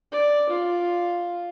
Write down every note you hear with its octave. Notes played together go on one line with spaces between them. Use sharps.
D5
F4